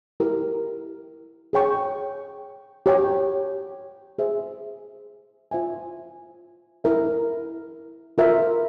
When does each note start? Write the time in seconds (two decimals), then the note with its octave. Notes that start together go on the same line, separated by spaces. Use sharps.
0.20 E4 G4 A#4
1.53 G#4 C#5 G5 C#6
2.86 G4 C#5 G5
4.19 G#4 C5 E5
5.51 F4 C5 E5 G#5
6.84 E4 A#4 E5
8.18 F4 A#4 E5